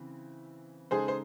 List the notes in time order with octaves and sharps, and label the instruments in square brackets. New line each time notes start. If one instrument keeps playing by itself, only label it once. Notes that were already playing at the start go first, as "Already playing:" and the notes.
Already playing: [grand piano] C#3 E3 C4
[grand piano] C#3 G#3 D#4 A4 [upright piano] G#4 C5
[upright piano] C5